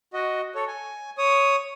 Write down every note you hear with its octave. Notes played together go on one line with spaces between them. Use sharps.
F#4 D#5
A4 C#5
G#5
C#5 D#6